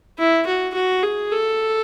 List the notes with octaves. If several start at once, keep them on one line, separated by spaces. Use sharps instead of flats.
E4
F#4
F#4
G#4
A4